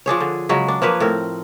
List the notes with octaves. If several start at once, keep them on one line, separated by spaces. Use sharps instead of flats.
F3 D4 G#4 C#5
D3
C#3 F#3 G#3
D4
F3 A#3 B4 C#5
A2 C4 A#4